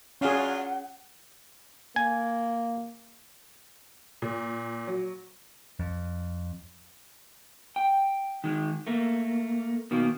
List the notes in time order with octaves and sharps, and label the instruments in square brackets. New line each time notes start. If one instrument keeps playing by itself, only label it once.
[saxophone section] F#3 D4 F4 [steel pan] C#4 G#4 [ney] F#5
[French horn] A#3 [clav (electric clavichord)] G#5
[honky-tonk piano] A#2
F#3
[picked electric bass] F2
[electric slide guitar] G5
D#3 G#3
A3 A#3
B2 D#3 A#3